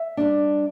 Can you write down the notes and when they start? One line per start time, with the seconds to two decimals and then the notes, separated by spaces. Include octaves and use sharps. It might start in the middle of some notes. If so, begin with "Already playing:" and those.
Already playing: E5
0.17 G3 D4